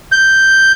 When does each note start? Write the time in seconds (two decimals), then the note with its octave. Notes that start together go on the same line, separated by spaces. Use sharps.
0.12 G6